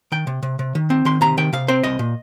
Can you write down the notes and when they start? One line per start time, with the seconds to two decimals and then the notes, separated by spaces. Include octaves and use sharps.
0.12 D#3 G5
0.27 C3
0.43 C3
0.59 C3
0.75 D#3
0.90 C4
1.05 D#3 C6
1.21 C3 A#5
1.37 D#3 G5
1.53 C3 F5
1.68 C4 C5
1.83 C2 D#5
1.99 A#2